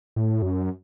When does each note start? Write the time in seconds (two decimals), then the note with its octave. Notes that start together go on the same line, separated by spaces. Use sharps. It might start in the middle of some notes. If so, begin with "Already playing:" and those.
0.16 A2
0.42 F#2